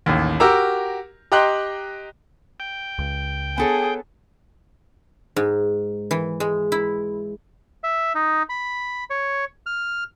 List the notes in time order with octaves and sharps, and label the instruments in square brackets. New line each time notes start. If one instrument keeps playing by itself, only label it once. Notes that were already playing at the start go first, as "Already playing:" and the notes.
[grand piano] A1 D#2
F#4 G4 A#4 A#5 E6
G4 D#5 G5 A#5 C6 F#6
[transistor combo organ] G5
[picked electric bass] C#2
[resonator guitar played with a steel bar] B3 A4 C#5 [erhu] G#4
[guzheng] G#2
E3
G#3
E4
[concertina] E5
D#4
B5
C#5
F6